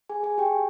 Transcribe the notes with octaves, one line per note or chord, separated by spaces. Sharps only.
G#4 G#5
G#4 G#5
G4 G5